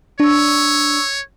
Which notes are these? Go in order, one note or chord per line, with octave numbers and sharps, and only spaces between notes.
D4 C#5 C#6 E6